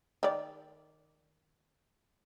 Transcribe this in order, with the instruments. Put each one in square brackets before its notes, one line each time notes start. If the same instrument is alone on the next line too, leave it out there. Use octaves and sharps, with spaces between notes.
[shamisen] D#3 D5